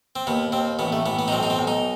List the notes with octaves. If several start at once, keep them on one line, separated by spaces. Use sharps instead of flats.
C4
D#2 B3
D#2 C4
A1 B3
A3
A1 B3
B3
D#4
B1 C4
D#4
C4
B1
D#4